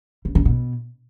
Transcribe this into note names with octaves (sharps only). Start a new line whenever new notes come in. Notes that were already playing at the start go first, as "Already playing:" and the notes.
C#3
D3
B2